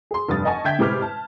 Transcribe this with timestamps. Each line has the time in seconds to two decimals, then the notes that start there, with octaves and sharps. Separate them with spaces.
0.11 G#4 C6
0.28 F1 G2 D#6 A6
0.45 D#5 F#5 G#5 A5 C#6
0.64 D3 E5 G5 G6 G#6 B6
0.79 A2 C3 G#3 B4 D6 F6
1.02 A5